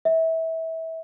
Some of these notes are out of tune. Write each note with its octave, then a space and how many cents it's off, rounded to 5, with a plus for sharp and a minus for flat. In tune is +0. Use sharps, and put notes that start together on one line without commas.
E5 -25